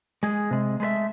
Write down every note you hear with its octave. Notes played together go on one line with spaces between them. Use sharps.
G#3 G#4
C3 G#3
G#3 A3 B4 E5